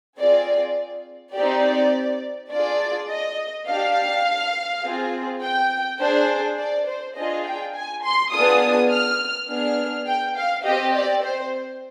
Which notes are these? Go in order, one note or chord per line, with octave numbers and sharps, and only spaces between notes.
C4 F4 G#4 D5
C4 D#4 G4 D5
D4 F4 G#4 D5
D#5
D4 G4 F5
C4 F4 G#4
G5
D4 G#4 C5
D5
C5
D4 F4 G#4 D#5
G5
G#5
C6
B3 D4 F4 G#4 D#6
F6
B3 D4 G#4 F6
G5
F5
C4 G4 D#5
D5
C5